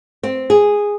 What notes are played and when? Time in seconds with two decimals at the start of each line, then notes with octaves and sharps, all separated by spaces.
0.23 C4
0.50 G#4